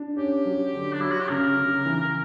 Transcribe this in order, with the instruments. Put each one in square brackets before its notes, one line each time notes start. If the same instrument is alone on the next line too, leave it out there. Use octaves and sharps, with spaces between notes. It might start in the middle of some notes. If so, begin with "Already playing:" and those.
Already playing: [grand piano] D4
[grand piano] C#4 [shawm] G4
[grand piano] F#3
D3
[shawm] D4
[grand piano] F#3 [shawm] E4
[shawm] F#4
G4
[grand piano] C#3 [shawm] A#4
[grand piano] C#3
E3